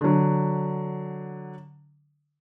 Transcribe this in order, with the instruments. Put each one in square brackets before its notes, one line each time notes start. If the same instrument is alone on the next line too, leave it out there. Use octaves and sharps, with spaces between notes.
[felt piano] D3 F#3